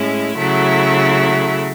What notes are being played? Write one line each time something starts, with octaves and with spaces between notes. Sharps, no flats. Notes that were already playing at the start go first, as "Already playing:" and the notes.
Already playing: A2 G#3 C#4 E4
C#3 F#3 A3 E4